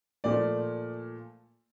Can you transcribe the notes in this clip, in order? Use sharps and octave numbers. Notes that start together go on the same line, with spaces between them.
A#2 F3 A3 D5